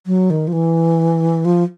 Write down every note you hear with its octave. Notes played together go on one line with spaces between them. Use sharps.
F#3
D#3
F3
E3
F3